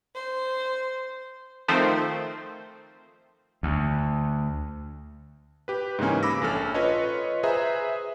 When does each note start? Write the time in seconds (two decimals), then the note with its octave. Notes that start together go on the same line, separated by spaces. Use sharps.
0.15 C5
1.68 D#3 F3 A3 C4 C5
3.63 D2
5.68 G4 B4
5.99 G#2 C#3 E3 A#3 C#4
6.23 B5 D6 E6 A#6
6.42 A#1 C#4 A4 F6
6.74 F4 B4 C#5 D#5
7.43 G#4 B4 C5 E5 A#5